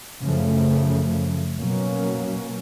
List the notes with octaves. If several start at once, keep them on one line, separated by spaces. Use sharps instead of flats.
F#2 C#3 F3 A3
B2 F#3 A#3 C#4